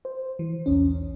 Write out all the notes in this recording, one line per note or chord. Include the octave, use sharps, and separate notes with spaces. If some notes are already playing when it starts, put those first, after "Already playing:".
C5
E3
B1 E2 C#4